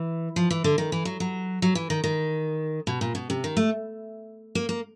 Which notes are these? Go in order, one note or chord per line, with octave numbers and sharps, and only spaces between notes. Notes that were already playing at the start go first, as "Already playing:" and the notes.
Already playing: E3
F3
E3
D3
D#3
E3
F#3
F#3
F#3
E3
D#3
D#3
B2
A#2
B2
C3
D#3
A3
A#3
A#3